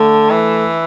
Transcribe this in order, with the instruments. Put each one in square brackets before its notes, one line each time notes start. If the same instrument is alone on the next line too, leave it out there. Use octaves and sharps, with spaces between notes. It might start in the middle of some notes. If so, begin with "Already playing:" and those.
Already playing: [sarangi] D3 [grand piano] A3
[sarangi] E3